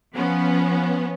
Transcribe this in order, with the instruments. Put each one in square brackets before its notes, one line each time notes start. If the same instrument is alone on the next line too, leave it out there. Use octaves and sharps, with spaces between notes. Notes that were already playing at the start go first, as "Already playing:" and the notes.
[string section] F3 B3 C#4